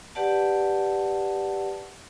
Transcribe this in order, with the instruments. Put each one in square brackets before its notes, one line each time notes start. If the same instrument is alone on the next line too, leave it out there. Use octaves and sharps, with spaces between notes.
[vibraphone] G4 B4 D5 F#5 A5